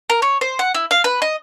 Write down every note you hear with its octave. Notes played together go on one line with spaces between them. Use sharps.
A#4
C#5
C5
F#5
E4
F5
B4
D#5